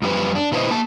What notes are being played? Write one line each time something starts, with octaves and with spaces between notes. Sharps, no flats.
F#2 F3 G3 F4 B4
D4
A#2 E4 B4 C5 D#5
A#3 A5